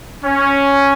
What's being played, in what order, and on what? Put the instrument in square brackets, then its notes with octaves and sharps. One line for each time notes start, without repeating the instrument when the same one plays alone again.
[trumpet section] C#4